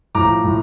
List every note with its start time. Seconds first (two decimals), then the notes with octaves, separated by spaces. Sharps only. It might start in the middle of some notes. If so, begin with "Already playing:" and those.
0.15 A2 F3 A#5 D6
0.44 A2